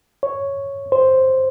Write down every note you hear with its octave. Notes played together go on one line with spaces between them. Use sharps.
C#5
C5